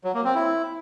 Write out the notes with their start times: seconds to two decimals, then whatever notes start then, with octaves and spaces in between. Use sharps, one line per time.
0.04 F#3
0.14 A#3
0.25 C4
0.35 E4